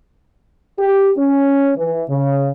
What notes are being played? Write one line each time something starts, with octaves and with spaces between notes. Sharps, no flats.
G4
C#4
E3
C#3